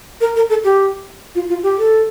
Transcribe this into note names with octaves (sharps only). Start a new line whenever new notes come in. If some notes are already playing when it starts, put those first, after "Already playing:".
A#4
A#4
A4
G4
F4
F4
G4
A4